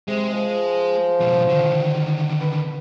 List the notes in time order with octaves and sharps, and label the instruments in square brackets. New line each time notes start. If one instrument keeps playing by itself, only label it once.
[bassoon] C3 [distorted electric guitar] G#3
[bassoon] F3
[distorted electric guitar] F2 B2
D3 D#3
[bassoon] B4